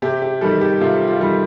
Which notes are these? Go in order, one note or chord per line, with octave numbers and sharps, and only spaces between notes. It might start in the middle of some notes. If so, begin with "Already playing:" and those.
C3 G4
G4
D#3 G3 A4
G4
C3 F4
F4
D#3 G3